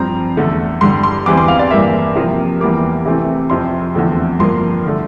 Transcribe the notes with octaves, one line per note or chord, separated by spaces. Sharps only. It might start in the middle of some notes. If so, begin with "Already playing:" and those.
Already playing: G2 F3 C4 A#5
E2 D3 A3
G2 D3 G3 C6
C6
E2 E3 G3 C4 D6
C6
F5
D5
G2 E3 A#3 E5
C3 F3 A#3
E2 E3 G3 A#3 D6
C3 E3 A3 C4
F2 C3 F3 C4 C6
E2 D3 F3 A3 C4
G2 F3 A#3 C6
D3 A3